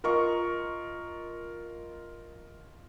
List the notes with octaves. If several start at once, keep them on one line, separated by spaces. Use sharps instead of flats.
F4 A#4 D#5 C#6